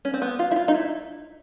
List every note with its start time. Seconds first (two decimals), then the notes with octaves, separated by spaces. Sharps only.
0.05 C#4
0.14 C4
0.22 B3
0.39 F4
0.51 E4
0.56 F4
0.68 D#4
0.74 E4